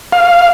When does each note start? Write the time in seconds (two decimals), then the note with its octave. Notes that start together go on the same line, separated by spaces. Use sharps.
0.12 F5